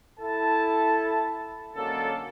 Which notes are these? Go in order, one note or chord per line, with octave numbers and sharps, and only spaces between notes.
E4 A4 A5
D3 F#3 G#3 A#3 C#4 A4